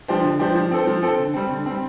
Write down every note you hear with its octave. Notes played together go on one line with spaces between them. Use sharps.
F3 D4 G4 C5
D3
F3 D4 G4 C5
F3
C4 A4 C5
F3
C4 A4 C5
D3
G3 C4
D3
G3 C4